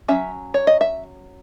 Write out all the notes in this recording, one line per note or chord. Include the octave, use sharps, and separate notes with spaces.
F#3 C#4 E5
C#5
D#5
E5